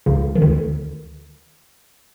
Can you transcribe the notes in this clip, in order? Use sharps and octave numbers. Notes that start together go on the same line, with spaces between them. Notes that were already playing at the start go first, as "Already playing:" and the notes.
C#2 C#3
D#3
D2 D3